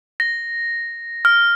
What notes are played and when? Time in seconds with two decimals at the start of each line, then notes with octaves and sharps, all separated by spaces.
0.20 A#6
1.25 F6